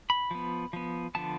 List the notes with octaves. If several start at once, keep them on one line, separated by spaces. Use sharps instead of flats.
B5
F3 B3
F3 B3
D3 F3 B3 A5